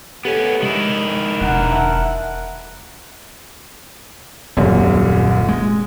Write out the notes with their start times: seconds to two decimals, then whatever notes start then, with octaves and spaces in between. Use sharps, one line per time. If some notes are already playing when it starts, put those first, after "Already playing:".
0.25 B3 C#4 G4 A4
0.62 C3 D#3 G#3 E4
1.41 E1 A#4 F#5
1.72 E5 A5 E6
4.57 D#1 C2 F#2 A#2
5.48 G#3